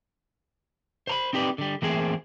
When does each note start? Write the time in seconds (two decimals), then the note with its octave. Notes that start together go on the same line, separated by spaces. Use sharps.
1.07 C5 A#5 B5
1.33 C4 D#4 G4 B4 D5
1.58 D3 G3
1.82 E3 A3 A#3 C4 G#4 C5